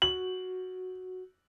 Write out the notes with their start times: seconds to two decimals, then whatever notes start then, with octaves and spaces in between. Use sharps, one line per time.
0.02 F#4 F#7